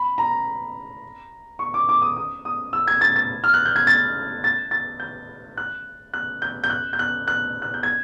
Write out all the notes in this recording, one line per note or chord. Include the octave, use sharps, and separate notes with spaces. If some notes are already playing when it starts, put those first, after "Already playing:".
Already playing: B5
A#5
C#6
D6
D6
D#6
D#6
D#6
E6
G#6
A6
A6
F6
F#6
G6
G#6
A6
A6
A6
G6
F#6
F#6
G6
G6
F#6
G6
F#6
F#6
F#6
G6
G#6